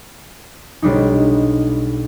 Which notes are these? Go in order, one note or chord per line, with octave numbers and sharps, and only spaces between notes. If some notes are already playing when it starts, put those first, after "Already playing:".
B1 G3 D4 D#4